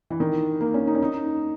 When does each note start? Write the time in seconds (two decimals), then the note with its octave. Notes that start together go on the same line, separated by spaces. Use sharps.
0.10 E3
0.20 D#3
0.61 A#3
0.74 C#4
0.87 D#4
0.95 C#4
1.02 D#4